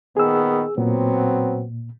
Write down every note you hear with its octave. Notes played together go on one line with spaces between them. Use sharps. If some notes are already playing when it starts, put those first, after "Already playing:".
A#2 D#3 B3 G#4 E6
A#2 F#3 B3 C4